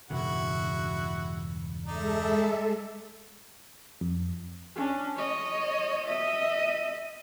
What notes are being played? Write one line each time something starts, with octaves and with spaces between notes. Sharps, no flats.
E1 G2 C#3 E4 F#4 F#5
G#3 D4 D#4 A4 D5 E5
F2
C#4 D4
C#5 D#5
D#5 E5